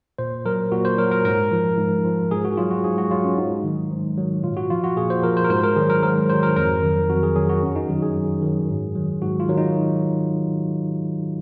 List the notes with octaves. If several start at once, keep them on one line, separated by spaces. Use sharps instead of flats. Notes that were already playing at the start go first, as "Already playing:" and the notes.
A#2 C5
F#3 A#4
A#2 F#4
C5
F#3 A#4
A#4
G#2 A#4
F3
G#2
F3
G#2 G#4
F#4
F#3 F4
F#4
G#2 G#4
F#4
F#3 F4
C#4
G#2 D#4
D#3 F#3
G#2
D#3 F#3
A#2 F4
F#4
F3 F4
F#4
A#2 G#4
C5
F3 A#4
C5
A#4
G#2 C5
A#4
D#3 F#3 G#4
A#4
G#2 A#4
D#3 F#3 C5
A#4
F2 A#4
D#3 F#3
F2 F#4
G#4
D#3 F#3 G#4
F#4
F#2 C#4
D#4
D#3 F#3 F#4
G#4
F#2
D#3 F#3
G#2
D#3 F#3
G#2 F#4
F4
D#3 F#3
D#4